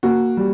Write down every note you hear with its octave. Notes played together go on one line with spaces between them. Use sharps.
A#3 F#4
G3